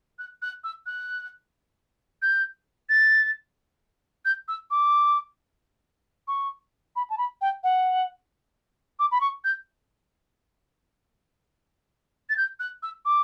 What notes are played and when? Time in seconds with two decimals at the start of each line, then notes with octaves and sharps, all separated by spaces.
0.19 F#6
0.42 F#6
0.64 E6
0.86 F#6
2.22 G6
2.89 A6
4.25 G6
4.48 E6
4.71 D6
6.28 C#6
6.96 B5
7.10 A5
7.18 B5
7.41 G5
7.64 F#5
8.99 D6
9.11 B5
9.21 C#6
9.44 G6
12.30 A6
12.37 G6
12.60 F#6
12.83 E6
13.05 D6